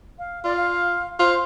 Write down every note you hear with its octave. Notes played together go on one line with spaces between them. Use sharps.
F5
F4 D5
F5
F4 C5